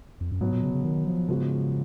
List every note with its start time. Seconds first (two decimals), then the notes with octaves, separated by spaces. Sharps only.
0.20 F2
0.31 F#2
0.41 G#2 B2 F#3 B3
0.52 A#2
0.63 C#3
0.74 C#3
0.84 D#3
1.07 F3
1.28 G#2 C#3 F3 G#3 B3 F#4